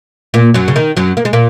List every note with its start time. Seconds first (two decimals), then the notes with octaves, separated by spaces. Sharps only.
0.34 A#2 A#3
0.54 F#2 F#3
0.68 C#3
0.76 D#3
0.97 F#2 F#3
1.17 A#3
1.25 G#3
1.33 A#2 A#3